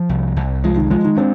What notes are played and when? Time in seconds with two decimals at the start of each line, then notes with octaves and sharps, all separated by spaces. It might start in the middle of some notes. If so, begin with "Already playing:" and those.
Already playing: F3
0.09 C2
0.36 C2
0.64 F3 G#3
0.77 D#3
0.90 F3 G#3
1.04 D#3
1.17 C4 D4